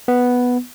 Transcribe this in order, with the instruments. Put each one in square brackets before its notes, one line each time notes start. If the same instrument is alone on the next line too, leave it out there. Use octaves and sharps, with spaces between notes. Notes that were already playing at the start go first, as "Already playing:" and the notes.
[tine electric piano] B3